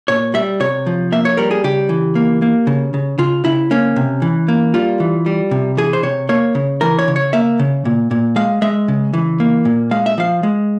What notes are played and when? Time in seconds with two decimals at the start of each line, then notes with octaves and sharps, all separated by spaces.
0.08 A#2 C#5
0.34 G3 E5
0.60 C3 C#5
0.86 F3
1.12 A#3 E5
1.25 C#5
1.37 G3 A#4
1.51 G#4
1.64 C#3 G4
1.89 E3
2.15 A#3
2.42 A#3
2.67 C#3
2.94 C#3
3.18 C#3 F4
3.45 C#3 E4
3.71 A#3 C#4
3.96 C3
4.22 E3
4.48 A#3
4.74 G3 F4
5.00 E3
5.26 G3
5.51 C3
5.77 E3 G#4
5.93 C5
6.03 C3 C#5
6.29 A#3 C#5
6.55 C#3
6.81 E3 A#4
6.99 C#5
7.08 C#3
7.16 C#5
7.33 A#3 E5
7.59 C#3
7.85 A#2
8.11 A#2
8.36 G#3 F5
8.62 G#3 E5
8.88 C#3
9.13 E3
9.40 A#3
9.65 A#2
9.91 G#3 F5
10.06 E5
10.18 F3 F5
10.43 G#3